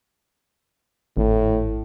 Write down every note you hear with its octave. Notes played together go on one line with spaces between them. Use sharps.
G#1 A2